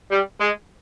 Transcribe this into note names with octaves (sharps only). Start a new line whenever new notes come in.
G3
G#3